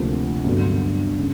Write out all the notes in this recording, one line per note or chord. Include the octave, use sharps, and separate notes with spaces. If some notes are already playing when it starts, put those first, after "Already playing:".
Already playing: D2 C3 F3 A#3
G2 D3 F#3 B3
C#3